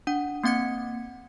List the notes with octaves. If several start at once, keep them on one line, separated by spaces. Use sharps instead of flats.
D4 F#5
A#3 C4 F#5 G#6 C#7